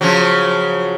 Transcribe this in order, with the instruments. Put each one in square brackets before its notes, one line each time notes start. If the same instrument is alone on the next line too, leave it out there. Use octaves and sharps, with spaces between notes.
[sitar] C#3 F3 F#3